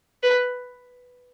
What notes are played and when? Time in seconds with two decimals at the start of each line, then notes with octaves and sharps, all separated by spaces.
0.23 B4